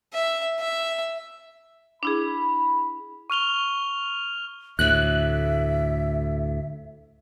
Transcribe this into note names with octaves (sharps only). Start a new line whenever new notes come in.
E5
E5
D4 E4 G#4 B5
C#6 F6 F7 G7
D2 A2 E5 F#6